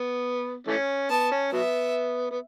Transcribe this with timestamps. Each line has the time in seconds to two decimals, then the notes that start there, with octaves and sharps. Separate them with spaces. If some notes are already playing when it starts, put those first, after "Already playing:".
Already playing: B3
0.67 E3 A3 C#4
1.10 B3 A5
1.32 C#4
1.53 F#3 B3 E5
2.31 B3